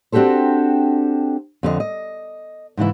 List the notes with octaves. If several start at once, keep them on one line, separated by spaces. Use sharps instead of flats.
C4 D4 F#4 G4 A4 C5
F2 D3 G4 D#5
D#5
G#2 C#3 E3 E4